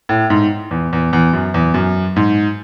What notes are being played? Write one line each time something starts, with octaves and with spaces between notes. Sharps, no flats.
A2
G#2
E2
E2
E2
F#2
E2
F#2
G#2